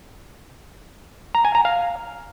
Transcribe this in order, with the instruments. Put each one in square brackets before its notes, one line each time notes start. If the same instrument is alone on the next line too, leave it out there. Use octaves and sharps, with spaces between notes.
[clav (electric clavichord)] A#5
G#5
A#5
F5